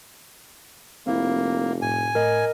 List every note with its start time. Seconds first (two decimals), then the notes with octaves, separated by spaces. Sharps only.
1.07 F1 A#3 C4 E4
1.82 A2 G#5
2.15 A2 A#4 D#5